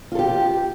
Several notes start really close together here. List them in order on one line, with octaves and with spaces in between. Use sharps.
F4 A4 G4